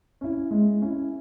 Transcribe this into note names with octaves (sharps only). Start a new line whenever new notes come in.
C#4 E4
G#3
C#4 E4